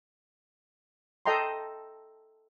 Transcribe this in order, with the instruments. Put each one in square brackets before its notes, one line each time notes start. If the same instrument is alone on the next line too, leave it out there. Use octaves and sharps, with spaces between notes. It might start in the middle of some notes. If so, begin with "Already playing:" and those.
[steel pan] A4 D#5 G5 A#5 C6